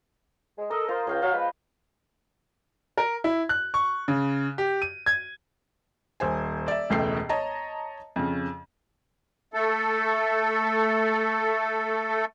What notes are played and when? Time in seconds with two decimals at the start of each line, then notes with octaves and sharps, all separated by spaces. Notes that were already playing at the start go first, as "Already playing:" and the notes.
0.58 G#3
0.71 A4 A#4 D#5
0.89 F4 A#4 C5
1.07 C#2 C#5 F5 G5
1.22 F#3 F5
1.34 F3 G#3 B4
2.97 A#4
3.24 E4
3.49 F#6
3.74 C#6
4.08 C#3
4.58 G4
4.82 D#7
5.06 G#6
6.20 D#1 C5 G#5
6.68 D5 E5
6.90 E1 C#2 B2 A3 G5 C7
7.29 C#5 D#5 A5 A#5
8.16 F2 C#3
9.54 A3 A4